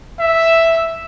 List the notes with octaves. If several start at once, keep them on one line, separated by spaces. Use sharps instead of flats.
E5